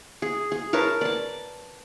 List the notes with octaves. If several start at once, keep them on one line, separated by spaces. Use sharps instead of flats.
G#4
G#4
A#4 B4 C#5 A5
D5 A5